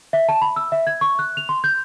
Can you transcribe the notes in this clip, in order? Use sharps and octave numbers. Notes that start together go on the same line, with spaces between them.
E5
A5
B5
E6
E5
G#6
C#6
F#6
F7
C6
G6